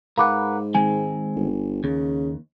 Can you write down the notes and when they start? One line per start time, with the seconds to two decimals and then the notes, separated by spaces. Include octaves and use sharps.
0.18 G#2 A#4 B4 F5 F#5 B5 D6
0.75 D#3 G#3 C4 G#5
1.36 G1
1.84 D#2 C#3